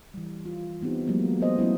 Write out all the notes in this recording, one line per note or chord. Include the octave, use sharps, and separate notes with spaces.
E3 G3
F4
E3 B3 C4 D#4 G4
F#3 G#3 A#3 B3
A3 B3 C#4 A4 C5 D#5
F#3 A3 B3 C#4 E4